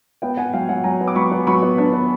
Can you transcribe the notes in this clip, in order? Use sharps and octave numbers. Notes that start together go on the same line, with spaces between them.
B3 F5 G5
B3 F#5 G#5
F#3 F5 G5
F#3 F#5 G#5
F#3 G#5 A#5
B3
D6
F#3 B5 C#6
B3
F#3 B5 C#6
B3
D4
B3